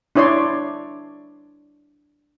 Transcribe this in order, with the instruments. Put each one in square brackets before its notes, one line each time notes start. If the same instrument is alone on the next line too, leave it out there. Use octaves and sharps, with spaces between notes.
[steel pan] D4 E4 C#5 D5 C6